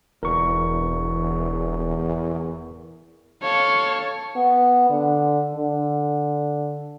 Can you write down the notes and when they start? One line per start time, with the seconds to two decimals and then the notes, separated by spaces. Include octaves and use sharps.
0.23 E1 E2 A#4 C#6
3.42 A4 C#5 F5
4.36 B3
4.90 D3
5.55 D3